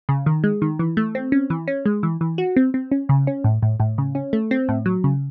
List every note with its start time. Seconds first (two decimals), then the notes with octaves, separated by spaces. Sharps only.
0.09 C#3
0.26 D#3
0.44 G#3
0.62 D#3
0.79 E3
0.97 A3
1.15 C4
1.32 C#4
1.50 E3
1.68 C#4
1.86 G#3
2.03 E3
2.21 E3
2.38 F#4
2.56 C4
2.74 C4
2.91 C#4
3.09 C#3
3.27 C#4
3.44 A2
3.62 A2
3.80 A2
3.98 C#3
4.15 C#4
4.33 A3
4.51 C4
4.69 A2
4.86 F#3
5.04 C#3